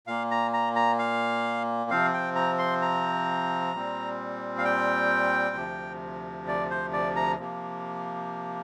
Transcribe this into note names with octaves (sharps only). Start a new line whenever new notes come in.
A#2 A#3 F5
A#5
A#5
A#5
F5
C3 F3 C4 F5
G5
A#5
C6
A#5
A#2 G3 C4
F5
G5
D2 C3 F3
D5
C5
D5
A#5
C3 F3 A#3